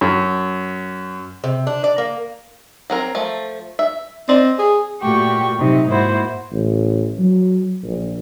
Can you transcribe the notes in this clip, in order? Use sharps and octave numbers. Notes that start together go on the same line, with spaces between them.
F#2
C3
D4
D5
A#3
F#3 C4 A#4
F3 A3
E5
C4 D5 D#5
G#4
A#2 A3 F#4 G4 C#6
C3 F#3 D#4
G#2 A#3 E4 F#4 C5
A1
F#3
A#1